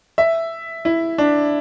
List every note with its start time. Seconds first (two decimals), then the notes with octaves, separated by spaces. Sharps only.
0.18 E5
0.85 E4
1.18 D4